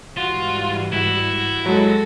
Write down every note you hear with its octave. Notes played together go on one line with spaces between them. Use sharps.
G#2 E3 G3 F4 F#4
E4 F#4
F#3 G#3 F#4 A4